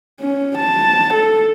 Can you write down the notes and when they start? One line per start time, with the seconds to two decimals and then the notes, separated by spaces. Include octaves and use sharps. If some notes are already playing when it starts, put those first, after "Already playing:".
0.21 C#4
0.58 A5
1.14 A4